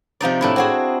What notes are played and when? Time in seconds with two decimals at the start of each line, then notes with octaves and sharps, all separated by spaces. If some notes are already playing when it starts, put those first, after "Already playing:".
0.21 C3 F3 D#4 D5
0.41 A2 D4 E4
0.56 C4 F#4 G#4